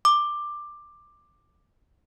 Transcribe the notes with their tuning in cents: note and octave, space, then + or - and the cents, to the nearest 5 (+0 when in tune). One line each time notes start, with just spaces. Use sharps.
D6 +15